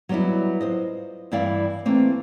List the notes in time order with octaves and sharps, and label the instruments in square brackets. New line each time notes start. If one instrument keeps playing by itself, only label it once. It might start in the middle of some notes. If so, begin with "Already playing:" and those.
[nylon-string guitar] F#3 G3 B3 D#4 E4
F4 C5 D#5
G2 E3 E4 D5 F5 G5
E3 A3 A#3 C4